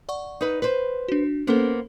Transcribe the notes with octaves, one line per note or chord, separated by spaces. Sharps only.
D5 F#5 C#6
D#4 B4
B4 C5
D4 F#4
A#3 B3 C#4 A4 C5